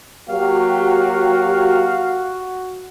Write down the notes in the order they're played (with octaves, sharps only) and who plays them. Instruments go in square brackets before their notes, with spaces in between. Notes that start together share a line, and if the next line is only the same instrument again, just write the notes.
[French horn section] F#3 A#3 G4 [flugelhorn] F#4 [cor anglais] F5